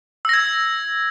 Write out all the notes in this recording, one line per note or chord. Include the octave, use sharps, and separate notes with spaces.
E6 G#6 A#6